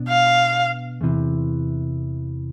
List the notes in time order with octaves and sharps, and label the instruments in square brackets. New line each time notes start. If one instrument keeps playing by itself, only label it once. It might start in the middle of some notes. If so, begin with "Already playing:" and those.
Already playing: [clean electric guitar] B2 B3 D4
[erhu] F5
[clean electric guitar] E2 C3 E3